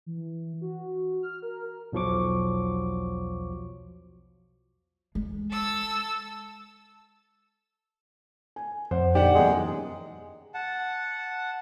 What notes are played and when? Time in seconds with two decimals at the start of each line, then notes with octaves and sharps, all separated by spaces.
0.06 E3
0.61 F#4
1.23 F6
1.42 A#4
1.93 B1 E2 F3 F#3 C#6 D6
5.15 G#3
5.51 A4 E6
8.56 G#5
8.91 F2 C5 F#5
9.15 A#2 D3 D#4 G4 D5 F#5
9.35 F#2 B2 E3 G#3
10.54 F#5 A5